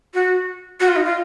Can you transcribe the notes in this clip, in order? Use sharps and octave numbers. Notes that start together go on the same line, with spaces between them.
F#4
F#4
F4
D#4
F4